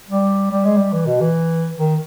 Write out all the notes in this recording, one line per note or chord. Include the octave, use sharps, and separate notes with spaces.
G3
G3
G#3
G3
E3
B2
E3
D#3